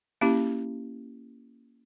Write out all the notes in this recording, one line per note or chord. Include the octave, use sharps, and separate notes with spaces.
A#3 C#4 E4 G4